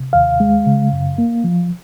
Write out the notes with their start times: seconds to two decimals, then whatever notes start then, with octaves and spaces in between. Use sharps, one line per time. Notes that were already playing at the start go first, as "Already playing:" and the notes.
Already playing: C3
0.13 D#2 F5
0.40 G#3
0.66 C#3
0.92 F#2
1.18 A#3
1.44 F3